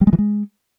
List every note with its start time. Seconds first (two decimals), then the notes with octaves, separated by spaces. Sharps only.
0.01 G3
0.07 G#3
0.13 E3
0.19 G#3